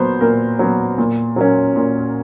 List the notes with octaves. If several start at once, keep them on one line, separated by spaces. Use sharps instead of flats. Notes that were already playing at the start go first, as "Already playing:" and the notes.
Already playing: A#2 F#3 B3 C5
A#2 A#4
F#3 B3
A#2
F#3 A#3 C#4
A#2